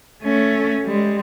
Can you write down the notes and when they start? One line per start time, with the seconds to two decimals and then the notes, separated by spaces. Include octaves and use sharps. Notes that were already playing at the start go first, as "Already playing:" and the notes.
0.23 A3 C#4
0.84 G3 G#3